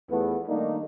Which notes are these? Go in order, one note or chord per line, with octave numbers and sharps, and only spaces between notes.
E2 F3 A3 B3
D#3 G3 A3 A#3 D4 D#4